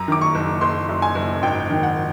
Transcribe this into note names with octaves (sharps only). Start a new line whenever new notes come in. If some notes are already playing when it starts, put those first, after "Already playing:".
Already playing: F#2 A#5
D#3 D6
C#6
F#1
F#1 C6
F#2
G#5
F#1
G#1 G5
D#3
F#5